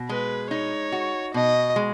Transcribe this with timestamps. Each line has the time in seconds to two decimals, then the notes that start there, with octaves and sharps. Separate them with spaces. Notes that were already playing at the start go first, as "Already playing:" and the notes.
Already playing: B2
0.09 G#3 B4
0.51 D#4 C#5
0.92 F#4
1.34 B2 D#5
1.76 G#3